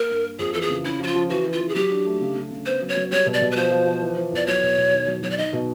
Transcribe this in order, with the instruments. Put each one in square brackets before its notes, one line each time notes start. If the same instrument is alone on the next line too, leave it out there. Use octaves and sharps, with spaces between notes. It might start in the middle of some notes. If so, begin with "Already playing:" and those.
Already playing: [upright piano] A#3 [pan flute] A#4
[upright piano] G2
A#3
[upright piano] F2 [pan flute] G#4
[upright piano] E3 [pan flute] A4
[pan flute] G#4
[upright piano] C#3
[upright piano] C#4 [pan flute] E4
[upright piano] F3 [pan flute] F#4
[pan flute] F4
[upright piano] F3
[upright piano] E3 [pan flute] F#4
[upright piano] E3
[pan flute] F4
[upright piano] E3
[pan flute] G#4
[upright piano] F#3 [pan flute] G4
[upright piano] D4
A3
C#3
C#3
C#3
[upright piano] B3 [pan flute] C5
[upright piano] F#3
[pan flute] C#5
[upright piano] F#3
[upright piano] G3 [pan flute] C#5
[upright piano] B2
[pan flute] D5
[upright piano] B2
[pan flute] B4
[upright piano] F3 [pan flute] C5
[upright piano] F3
F3
E3
E3
[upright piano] E2 [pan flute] D5
[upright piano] F#3 [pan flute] C#5
[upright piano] B2
B2
D#3
F#3
[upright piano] F#3 [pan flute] C#5
[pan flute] D5
[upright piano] D#4 [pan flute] D#5
[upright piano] B2